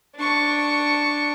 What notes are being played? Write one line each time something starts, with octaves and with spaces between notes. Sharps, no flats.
D4 C#6